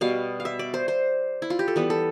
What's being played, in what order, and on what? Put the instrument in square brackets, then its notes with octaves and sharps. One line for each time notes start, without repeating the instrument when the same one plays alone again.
[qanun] B2 G3 B3 F5
F5
E5
D5
C5
C5
E4
F4
G4
A4
E3 G3 B3 B4
A4